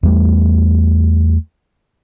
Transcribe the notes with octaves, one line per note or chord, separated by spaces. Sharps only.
E2 G3 A3